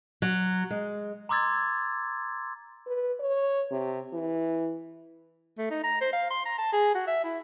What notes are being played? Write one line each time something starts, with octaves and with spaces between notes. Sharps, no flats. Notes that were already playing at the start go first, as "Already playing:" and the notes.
F#3
G#3
A#5 C6 D6 E6 G#6 A6
B4
C#5
C3
E3
A3
D#4
A#5
C5
F5
C6
A#5
A5
G#4
F#4
E5
E4